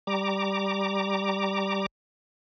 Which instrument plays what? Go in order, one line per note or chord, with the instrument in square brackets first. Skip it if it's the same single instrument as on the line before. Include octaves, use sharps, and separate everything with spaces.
[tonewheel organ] G3 A#5 D6